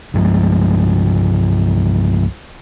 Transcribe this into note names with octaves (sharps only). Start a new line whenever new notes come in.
C2 G2 F3 G#3